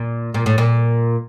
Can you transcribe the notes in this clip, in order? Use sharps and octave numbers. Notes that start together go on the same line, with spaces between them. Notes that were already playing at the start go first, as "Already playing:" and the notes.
Already playing: A#2
A#2
A2
A#2